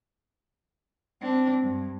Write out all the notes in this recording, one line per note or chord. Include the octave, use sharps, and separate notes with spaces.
C4 D4
G2